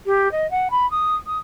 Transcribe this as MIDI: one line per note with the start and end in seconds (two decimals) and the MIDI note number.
0.06 0.31 67
0.31 0.49 75
0.50 0.68 78
0.70 0.89 83
0.90 1.14 87
1.26 1.38 87